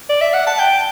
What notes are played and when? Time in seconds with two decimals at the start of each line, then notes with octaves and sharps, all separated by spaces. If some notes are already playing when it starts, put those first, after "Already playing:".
0.09 D5
0.21 E5
0.34 F#5
0.47 A5
0.59 G5